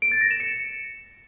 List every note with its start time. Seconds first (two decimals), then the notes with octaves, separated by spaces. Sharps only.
0.02 D7
0.12 A6
0.21 A#6
0.31 E7
0.40 C#7